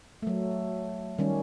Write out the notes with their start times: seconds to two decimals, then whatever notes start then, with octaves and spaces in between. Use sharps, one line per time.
0.22 F#3 A3
1.19 D#3 G3 C#4